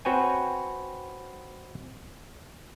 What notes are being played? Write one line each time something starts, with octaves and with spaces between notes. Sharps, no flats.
C4 F#4 B4 C#5 G5 G#5